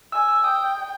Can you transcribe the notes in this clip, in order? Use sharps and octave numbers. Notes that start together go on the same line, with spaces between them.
G#5 E6
E6
G5 D#6